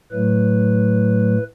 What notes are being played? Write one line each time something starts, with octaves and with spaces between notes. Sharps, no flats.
A2 F#3 A3 B4